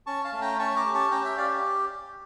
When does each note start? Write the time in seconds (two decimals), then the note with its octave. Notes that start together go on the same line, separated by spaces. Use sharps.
0.06 C#4 A5 C#6
0.25 F5 A5
0.33 A3
0.41 G5 A#5
0.59 C#4 A5 C#6
0.76 A#5 D6
0.85 G4
0.94 A5 C#6
1.11 C#4 G5 A#5
1.24 E5 G5
1.37 G4 D5 F5